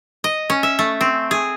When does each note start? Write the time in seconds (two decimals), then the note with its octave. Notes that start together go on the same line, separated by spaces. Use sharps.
0.24 D#5
0.50 C#4
0.63 E5
0.79 A3
1.01 C4
1.31 G#4